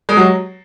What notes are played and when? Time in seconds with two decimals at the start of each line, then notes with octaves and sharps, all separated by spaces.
0.09 G#3
0.17 F#3